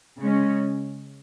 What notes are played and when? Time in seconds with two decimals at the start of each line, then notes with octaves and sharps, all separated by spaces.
0.20 C#3 G#3 C#4